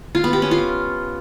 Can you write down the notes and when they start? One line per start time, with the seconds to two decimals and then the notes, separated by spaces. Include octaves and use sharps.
0.15 F4
0.24 B3
0.33 G4
0.42 C#4
0.51 F4